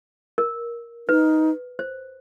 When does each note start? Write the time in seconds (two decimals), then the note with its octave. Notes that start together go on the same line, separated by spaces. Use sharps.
0.38 A#4
1.09 D#4 B4
1.79 C5